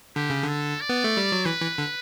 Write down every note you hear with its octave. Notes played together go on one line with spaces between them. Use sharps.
D3 G4
C#3
D3 A4
D5
B3
A3
G3
F#3
E3 B4
E3
D3